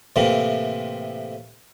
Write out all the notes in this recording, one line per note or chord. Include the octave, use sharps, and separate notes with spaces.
A2 C3 E3 A#3